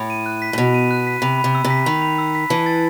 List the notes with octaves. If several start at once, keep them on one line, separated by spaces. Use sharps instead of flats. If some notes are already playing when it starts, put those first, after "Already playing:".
Already playing: A2 B5
D#7
F#6
B6
A2
B2 B5
D#7
F#6
B6
C3 B5
B5
C3
E6
C3
B6
D#3 B5
B5
E6
B6
E3 A5
A6